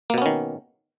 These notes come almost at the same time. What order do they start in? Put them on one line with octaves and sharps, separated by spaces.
A#3 B2 B3 C#4 D#3